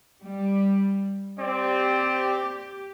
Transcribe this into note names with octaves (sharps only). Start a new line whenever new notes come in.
G3
C4 G4 D5 D6